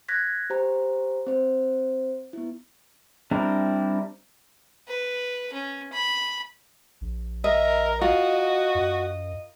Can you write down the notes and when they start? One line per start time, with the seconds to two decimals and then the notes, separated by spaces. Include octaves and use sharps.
0.08 F#6 G#6 A#6 B6
0.50 G4 C5 A#5
1.27 C4 C5
2.33 B3 E4
3.31 G3 C4 D4 E4 A#4
4.88 B4
5.53 C#4
5.93 B5
7.01 A#1
7.44 A#4 D#5 E5
8.02 F4 F#4 D#5
8.75 F#2